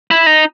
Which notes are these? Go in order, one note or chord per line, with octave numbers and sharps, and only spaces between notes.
E4
D#4